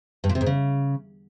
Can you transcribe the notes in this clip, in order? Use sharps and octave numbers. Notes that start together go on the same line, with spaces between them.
G2
A#2
C3
G#2
C#3